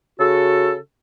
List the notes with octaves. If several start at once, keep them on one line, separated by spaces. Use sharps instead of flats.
C#3 F#4 A4